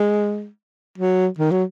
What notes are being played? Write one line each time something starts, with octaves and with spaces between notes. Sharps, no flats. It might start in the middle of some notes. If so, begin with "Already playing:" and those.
Already playing: G#3
F#3
D#3
F#3